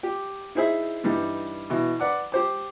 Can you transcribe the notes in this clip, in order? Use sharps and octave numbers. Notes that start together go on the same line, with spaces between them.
G4
D#4 E4 G#4 C5 E5
G2 E3 G3 D#4
B2 E3
B4 D5 F#5 D6
G4 C5 D6